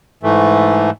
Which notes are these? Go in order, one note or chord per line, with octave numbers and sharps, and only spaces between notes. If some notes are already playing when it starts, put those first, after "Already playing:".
G#2 E3 A3